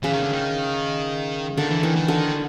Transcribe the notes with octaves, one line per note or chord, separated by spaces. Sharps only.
C#3 E3
D#3
D3
D#3
D3 D#3
E3
D#3 E3
D#3
D3